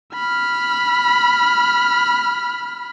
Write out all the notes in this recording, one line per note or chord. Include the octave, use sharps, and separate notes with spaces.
B5 F6